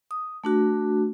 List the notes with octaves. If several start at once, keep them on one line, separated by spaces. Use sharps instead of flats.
D#6
A3 D4 F#4